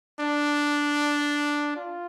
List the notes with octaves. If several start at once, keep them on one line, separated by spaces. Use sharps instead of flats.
D4
F4